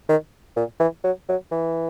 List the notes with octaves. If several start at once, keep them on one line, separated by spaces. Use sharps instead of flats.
D#3
A#2
E3
F#3
F#3
E3